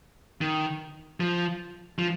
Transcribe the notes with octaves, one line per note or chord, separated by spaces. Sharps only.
D#3
F3
F3